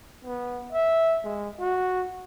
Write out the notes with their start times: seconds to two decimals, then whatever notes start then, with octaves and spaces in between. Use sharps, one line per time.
0.25 B3
0.72 E5
1.24 G#3
1.60 F#4